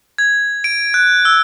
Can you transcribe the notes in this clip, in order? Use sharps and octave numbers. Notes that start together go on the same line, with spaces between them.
G#6
D7
F#6
E6